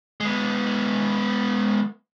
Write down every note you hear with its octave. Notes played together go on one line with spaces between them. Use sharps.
G#3 B3